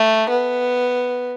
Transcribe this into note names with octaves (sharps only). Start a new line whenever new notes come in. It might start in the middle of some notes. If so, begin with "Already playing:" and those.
Already playing: A3
B3